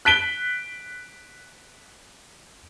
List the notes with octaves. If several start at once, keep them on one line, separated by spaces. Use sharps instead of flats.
F#6 B6 D7 G7